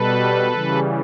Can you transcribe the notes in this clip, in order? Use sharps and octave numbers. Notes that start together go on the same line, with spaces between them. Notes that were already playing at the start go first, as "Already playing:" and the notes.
Already playing: B2 G3 A4 B4
C#3 E3 G3